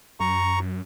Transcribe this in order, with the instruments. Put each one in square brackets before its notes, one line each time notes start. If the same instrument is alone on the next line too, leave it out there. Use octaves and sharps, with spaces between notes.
[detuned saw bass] F#2 [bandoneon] A#5 C#6